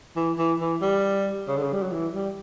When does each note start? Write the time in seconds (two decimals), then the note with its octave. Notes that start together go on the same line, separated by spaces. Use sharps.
0.16 E3
0.38 E3
0.60 E3
0.82 G3
1.48 C#3
1.57 D3
1.63 C#3
1.73 G3
1.82 F#3
1.92 E3
2.14 G3